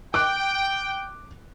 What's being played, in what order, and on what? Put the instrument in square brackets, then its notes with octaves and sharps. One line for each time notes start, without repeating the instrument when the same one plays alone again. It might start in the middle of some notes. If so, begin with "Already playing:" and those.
[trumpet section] G5 [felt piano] D6 F#6 D7